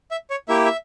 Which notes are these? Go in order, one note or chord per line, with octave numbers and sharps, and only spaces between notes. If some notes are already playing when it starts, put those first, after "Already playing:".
E5
C#5
A#3 E4 G4 E5
E5